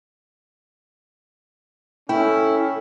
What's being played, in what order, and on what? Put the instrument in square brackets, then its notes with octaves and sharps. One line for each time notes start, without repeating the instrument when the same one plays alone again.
[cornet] C#4 [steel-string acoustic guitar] E4 [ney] A4 [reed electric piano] G5